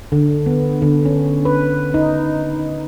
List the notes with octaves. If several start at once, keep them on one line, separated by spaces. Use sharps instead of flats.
D3
B3
D3
C#4
B4
D#4